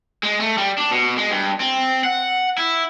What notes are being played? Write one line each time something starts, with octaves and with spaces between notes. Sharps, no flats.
G#3
A3
G3
D4
B2
G#3
G2
C4
F#5
E4